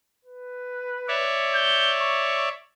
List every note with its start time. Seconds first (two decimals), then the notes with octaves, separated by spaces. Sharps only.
0.25 B4
1.08 C#5 D5 E5
1.54 G6
2.00 C#6